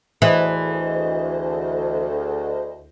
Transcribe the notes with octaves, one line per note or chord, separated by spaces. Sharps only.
D2 E3 G#4 C5 D#5